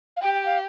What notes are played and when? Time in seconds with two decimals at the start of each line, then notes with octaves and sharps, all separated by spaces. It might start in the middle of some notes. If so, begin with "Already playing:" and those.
0.17 F5
0.22 G4 G5
0.34 G5
0.46 F5